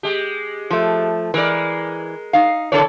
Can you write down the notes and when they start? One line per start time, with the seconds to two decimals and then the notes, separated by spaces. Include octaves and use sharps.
0.03 G#3 G4
0.70 F3 A3
1.34 E3 G#3 A#4 D5
2.33 D#4 F5
2.72 C#3 E4 A4 C#5 D5